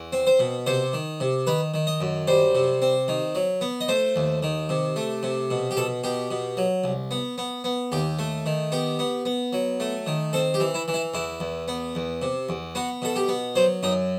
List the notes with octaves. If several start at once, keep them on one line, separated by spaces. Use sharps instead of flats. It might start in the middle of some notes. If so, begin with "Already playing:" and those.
Already playing: E2
C4
C5
B2
C3 C5
D#3
C3
D#3 B4
D#3
D#5
F#2
G3 C5
C3
C4
D#3
F#3
B3
D#5
A3 C5
D#2
D#3
C3
A3
C3
B2
G4
B2 A4
B2 G4
B2
F#3
C2
B3
B3
B3
D#2 G4
A3
D#3
B3 G4
B3
B3
F#3
A3
D#3
C4 A4
G4
E3
E4
E3
E4
E2 E4
E2
B3
E2
C3
E2
B3 F#4
B2 A4
G4
B3
F#3 C5
F#2 D#4